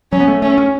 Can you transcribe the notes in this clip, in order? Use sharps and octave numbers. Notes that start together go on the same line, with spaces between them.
F#3 C#4
B3
A3
A3 C#4
C#4